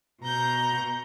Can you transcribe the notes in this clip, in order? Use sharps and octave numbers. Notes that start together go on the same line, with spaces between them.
B2 A#5 G6